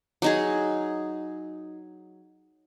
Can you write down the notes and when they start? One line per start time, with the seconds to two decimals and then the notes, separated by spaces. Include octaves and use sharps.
0.22 F#3 D#4 G#4